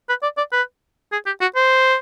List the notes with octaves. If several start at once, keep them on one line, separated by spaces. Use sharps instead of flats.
B4
D5
D5
B4
G#4
G4
F#4
C5